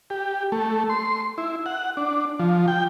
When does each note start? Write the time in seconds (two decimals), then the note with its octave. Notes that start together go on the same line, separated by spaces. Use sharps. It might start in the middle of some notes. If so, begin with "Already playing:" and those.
0.10 G4
0.52 A3
0.89 C6
1.38 E4
1.66 F#5
1.97 D4
2.39 F3
2.68 G5